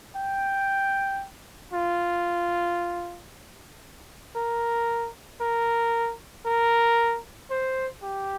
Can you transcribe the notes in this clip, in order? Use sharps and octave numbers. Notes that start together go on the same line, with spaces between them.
G5
F4
A#4
A#4
A#4
C5
G4